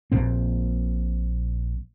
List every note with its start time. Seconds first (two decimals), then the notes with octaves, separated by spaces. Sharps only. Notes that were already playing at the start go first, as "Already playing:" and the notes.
0.12 A#1 A#2 C4